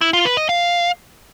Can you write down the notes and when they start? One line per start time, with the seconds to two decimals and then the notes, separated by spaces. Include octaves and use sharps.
0.01 E4
0.13 F4
0.25 B4
0.37 D#5
0.49 F5